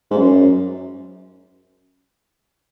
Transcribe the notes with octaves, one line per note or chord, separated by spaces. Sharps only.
G#2
F#2